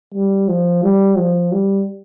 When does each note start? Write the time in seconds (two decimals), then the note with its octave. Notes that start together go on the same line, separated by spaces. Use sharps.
0.14 G3
0.49 F3
0.83 G3
1.18 F3
1.52 G3